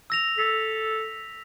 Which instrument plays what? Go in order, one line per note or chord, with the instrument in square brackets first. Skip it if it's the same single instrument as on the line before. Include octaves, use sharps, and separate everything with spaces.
[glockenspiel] E6 A#6 F7
[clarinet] A4 [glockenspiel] B6